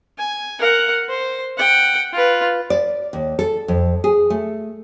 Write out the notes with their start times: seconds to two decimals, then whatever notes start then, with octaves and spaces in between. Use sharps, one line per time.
0.18 G#5
0.60 A#4 F#5
1.09 C5
1.57 F#5 G5
2.12 F4 B4
2.70 D5
3.13 D#2
3.39 A4
3.68 F2
4.04 G#4
4.30 A3